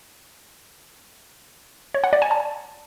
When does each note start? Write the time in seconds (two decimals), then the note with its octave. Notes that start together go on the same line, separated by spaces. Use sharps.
1.94 C#5
2.04 F#5
2.13 D5
2.22 G#5
2.31 A5